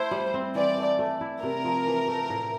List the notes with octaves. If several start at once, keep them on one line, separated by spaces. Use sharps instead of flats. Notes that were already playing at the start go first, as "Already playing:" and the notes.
Already playing: A3 E4 C5
G3
C4
E3 D5
A3
A3
E4
C3 A#4
F3
E3
A3
A2